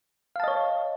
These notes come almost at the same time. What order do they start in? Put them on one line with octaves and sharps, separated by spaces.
F5 A5 D#5 C#5